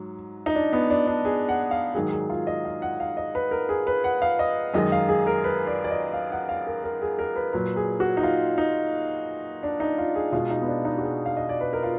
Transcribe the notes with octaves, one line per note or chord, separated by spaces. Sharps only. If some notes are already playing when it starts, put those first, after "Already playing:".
Already playing: G#2 F#3
D#4
D4
B3
D4
D4
G#4
F#5
F5
G#2 D#3 F#3 G#4
G#4
F4
D#5
F5
F#5
F5
D#5
B4
A#4
G#4
B4
F#5
F5
D#5
F#2 D#3 G#3 D#5
F5
G#4
A#4
B4
D5
D5
D#5
F5
F#5
F5
A#4
A#4
G#4
A#4
B4
A#2 F#3 B4
G#4
F#4
D#4
F4
D#4
D4
D#4
F4
G#4
B2 G#3 F4
D#4
B3
D4
D#4
F#4
G#4
F5
D#5
D5
B4
A#4
F4